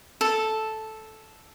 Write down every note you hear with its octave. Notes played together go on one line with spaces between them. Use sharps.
A4